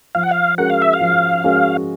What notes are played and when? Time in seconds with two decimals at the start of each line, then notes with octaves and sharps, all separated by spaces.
0.15 F3 F5
0.23 F#5
0.31 F5
0.58 G#3 C#4 F#4 A#4 F#5
0.70 F5
0.82 E5
0.93 F5
1.01 F3
1.44 G#3 C#4 F#4 A#4